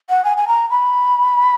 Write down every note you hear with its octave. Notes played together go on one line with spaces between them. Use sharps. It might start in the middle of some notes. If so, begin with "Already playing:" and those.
F#5
G#5
G#5
A#5
B5